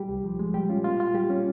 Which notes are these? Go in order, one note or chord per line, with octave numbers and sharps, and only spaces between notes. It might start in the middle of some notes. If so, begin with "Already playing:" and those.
Already playing: G3 G4
C2
F3
G#3
G3 G4
C#4 F4
A#3 F4
F4
G3 G4
C#4